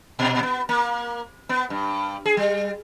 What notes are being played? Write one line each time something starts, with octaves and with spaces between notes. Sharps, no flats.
A#2
B3
A#3
B3
G2
G#4
G3